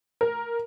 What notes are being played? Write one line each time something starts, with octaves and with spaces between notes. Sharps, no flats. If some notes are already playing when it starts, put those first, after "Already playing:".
A#4